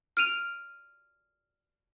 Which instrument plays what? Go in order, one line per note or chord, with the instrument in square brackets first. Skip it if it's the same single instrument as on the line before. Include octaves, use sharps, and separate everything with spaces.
[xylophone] F6 D7 D#7 F7